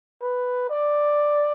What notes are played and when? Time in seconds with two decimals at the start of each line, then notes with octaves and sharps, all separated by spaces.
0.22 B4
0.70 D5